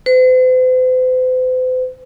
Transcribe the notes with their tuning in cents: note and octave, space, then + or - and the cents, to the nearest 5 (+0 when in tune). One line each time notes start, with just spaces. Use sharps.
C5 -45